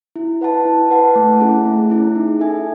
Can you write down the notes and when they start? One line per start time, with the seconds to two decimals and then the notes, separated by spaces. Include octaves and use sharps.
0.16 E4
0.41 B4 F#5 A5
0.65 E4
0.91 B4 F#5 A5
1.16 A3
1.40 C#4 E4 G#4
1.65 A3
1.90 C#4 E4 G#4
2.15 D#4
2.40 A4 E5 G#5